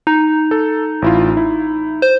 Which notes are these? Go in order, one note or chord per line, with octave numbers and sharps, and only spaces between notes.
D#4
A4
A1 E4 F4
E4
C5